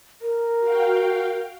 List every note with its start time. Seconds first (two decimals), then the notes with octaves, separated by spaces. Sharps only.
0.21 A#4
0.60 F#4 F5 G5